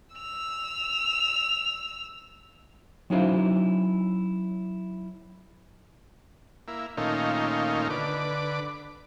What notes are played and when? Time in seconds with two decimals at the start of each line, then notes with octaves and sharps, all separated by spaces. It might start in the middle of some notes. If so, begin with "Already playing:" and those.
0.15 E6 F7
3.10 F#3 C#4 D#4 E4 C5 F5
6.68 A#3 E4
6.97 A#2 D#3 A3 C#4 D#4 F4
7.90 D3 B4 D6